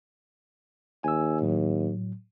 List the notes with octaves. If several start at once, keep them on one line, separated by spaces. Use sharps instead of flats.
D#2 G#5 E6
A2 F#3